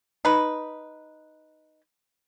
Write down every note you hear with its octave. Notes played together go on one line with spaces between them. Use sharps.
D#4 B4